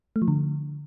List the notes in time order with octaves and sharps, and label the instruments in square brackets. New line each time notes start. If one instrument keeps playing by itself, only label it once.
[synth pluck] A3
F3
D3